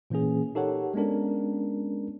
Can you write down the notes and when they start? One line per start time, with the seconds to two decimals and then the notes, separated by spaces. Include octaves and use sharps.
0.10 A#2 E3 A#3 C#4 G#4
0.55 D#4 G4 A4 A#4 C#5 F#5
0.94 G#3 B3 C#4 D4 A#4